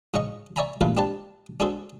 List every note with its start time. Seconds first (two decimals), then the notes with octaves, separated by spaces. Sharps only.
0.14 G#2 C#3 C#4 D#5 C#6
0.56 C#5 D5 E5 G#5 A#5 B5
0.81 E2 G2 A#2 A3 B4 F5
0.97 C4 D4 G4 B4 A5
1.60 C#4 D4 F#4 G#4 A4 C5